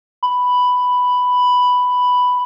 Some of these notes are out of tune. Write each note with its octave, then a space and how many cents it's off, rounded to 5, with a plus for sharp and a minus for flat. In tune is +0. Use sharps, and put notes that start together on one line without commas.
B5 +5